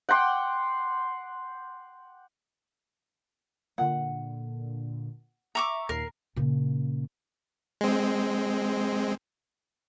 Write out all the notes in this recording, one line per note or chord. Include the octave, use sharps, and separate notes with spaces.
F#5 G5 C6 D6
A#2 D3 F#5
E5 A#5 C#6 D6
D#2 A#2 A#4 C7
A#2 C#3
G#3 C4